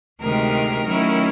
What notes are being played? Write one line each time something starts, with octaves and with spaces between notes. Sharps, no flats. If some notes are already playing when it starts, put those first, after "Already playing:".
D2 C3 D#3 G#3 A#4
D#3 F#3 A3 C#4 E4